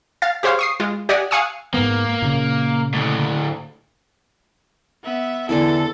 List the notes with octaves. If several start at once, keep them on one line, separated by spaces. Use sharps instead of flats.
F5 A6
G4 G#4 C5 C#5 F5
C#6 D#6 C7
G#3 F4
G4 D5 D#5 F#5 G#5
F5 F#5 G#5 C#6 D#6 E6
G#2 A#3 B3
A#2 C#3
D2 A2
B3 E5
E2 D3 E3 E4 A4